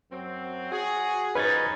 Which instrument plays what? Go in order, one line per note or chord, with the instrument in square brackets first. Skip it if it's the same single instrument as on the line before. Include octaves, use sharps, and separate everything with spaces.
[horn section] F#2 F#3 C4
F#4 G#4
[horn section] F3 C#4 D#4 [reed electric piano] B4 G#6 A6